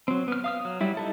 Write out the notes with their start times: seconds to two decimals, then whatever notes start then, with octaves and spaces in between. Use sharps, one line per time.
0.08 F#3 C4
0.28 B3 F6
0.44 F5 D#6 F6
0.65 F#3
0.81 F#3 G3 E4
0.97 D#4 E4 A4